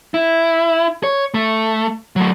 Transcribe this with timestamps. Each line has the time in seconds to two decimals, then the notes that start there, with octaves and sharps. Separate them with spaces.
0.14 E4
1.03 C#5
1.34 A3
2.16 F#3 A3